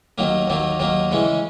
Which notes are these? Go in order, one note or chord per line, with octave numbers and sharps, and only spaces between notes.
D#2 D#3 F#3 A#3
D#2 D#3 F#3 A#3
D#2 D#3 F#3 A#3
C#3 E3 G#3 C#4